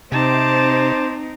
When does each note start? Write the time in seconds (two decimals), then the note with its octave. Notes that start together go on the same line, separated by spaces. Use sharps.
0.12 C3 C4 D#4 C5 A5 D6